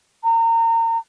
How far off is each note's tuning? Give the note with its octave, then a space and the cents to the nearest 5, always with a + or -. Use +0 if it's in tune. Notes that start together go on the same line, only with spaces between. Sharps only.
A#5 -30